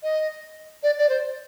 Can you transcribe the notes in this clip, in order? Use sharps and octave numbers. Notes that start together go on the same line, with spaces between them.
D#5
D5
D5
C5